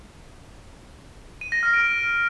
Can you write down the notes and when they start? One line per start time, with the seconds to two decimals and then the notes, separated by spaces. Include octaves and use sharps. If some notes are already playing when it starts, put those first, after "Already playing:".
1.41 D#7
1.52 A#6
1.63 F6
1.74 D7